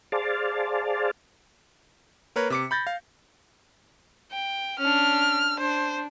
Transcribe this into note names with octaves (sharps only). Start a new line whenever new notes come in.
G#4 C5 D5 F5 A5
A#3 A#4 B4 C#5
C3 D6 C#7
B5 G6 A6 A#6
F5
G5
C#4 D4 F6
D4 C5